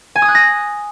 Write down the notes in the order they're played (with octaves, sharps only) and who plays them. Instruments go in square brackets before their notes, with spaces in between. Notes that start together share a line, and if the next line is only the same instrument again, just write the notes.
[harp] G#5
D#6
F#6
A#6